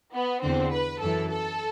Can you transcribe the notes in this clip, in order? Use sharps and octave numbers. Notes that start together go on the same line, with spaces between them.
B3
E2 D3 C4
B4
F#2 E3 A4
A4